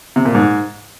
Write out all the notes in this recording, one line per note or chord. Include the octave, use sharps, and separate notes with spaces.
C3
A#2
G#2